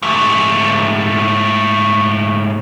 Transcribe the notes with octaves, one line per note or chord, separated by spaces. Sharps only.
G#2 A3